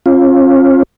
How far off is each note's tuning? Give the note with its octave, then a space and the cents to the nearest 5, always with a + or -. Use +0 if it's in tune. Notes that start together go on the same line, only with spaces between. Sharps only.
C#4 -45 F4 +0